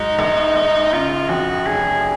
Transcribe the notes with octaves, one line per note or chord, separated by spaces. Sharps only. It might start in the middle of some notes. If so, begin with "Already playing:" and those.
Already playing: G#2 F#3 D#4
A#1
A#1
C#3 F4
F2 F#4
F1 G#4